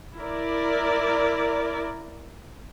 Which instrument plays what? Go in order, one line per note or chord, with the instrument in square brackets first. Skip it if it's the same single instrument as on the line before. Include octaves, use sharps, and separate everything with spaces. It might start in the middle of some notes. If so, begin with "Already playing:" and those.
[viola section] E4 A#4 D5